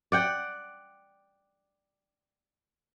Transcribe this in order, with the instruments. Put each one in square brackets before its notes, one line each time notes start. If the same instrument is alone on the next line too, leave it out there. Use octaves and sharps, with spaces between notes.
[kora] D5 F#5 G5